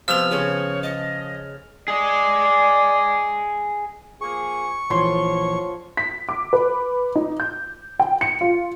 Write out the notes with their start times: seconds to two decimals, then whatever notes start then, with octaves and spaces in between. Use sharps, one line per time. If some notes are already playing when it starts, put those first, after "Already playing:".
0.08 C3 F3 B3 C5 E6 F6 F7
0.31 C#3 C#4 G#4 C#5
0.83 D#5 A5
1.88 G#4 D5 D#5
4.21 F3 A#3 G#4 C#6
4.90 A#1 D3 E3 F3 C#5 C6
5.97 B6
6.29 D6
6.53 B4
7.15 D#4
7.40 G6
8.00 G5
8.21 C#7
8.41 F4